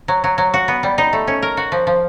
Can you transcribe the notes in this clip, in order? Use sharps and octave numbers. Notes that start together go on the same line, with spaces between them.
F#3
F#3
F#3
F#4
B3
G3
D#4
A3
C#4
A#4
F#4
F3
F3